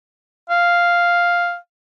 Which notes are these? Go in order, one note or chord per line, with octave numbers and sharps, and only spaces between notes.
F5